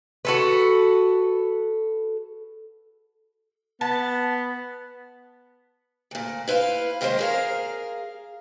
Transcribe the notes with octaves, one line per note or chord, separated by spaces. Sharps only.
F#4 A4 B4
B3 A5
D2 A#2
E4 B4 C5 F5
D#3 G#3 A#3 C#4 C5 C#5
G#4 A#4 F5